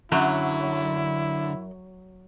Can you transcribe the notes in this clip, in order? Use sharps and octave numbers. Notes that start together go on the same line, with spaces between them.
F#2 D3 F#3 E4